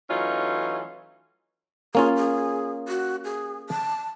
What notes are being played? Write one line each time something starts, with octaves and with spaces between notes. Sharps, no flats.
E3 F#3 A3 C#4 D#4 F4
A#3 C#4 F4 G#4
G#4
F#4
G#4
A5